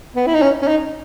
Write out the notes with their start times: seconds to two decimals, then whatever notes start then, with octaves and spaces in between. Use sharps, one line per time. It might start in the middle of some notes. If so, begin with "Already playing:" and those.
0.16 B3
0.27 E4
0.34 D#4
0.42 C#4
0.62 C#4
0.68 D#4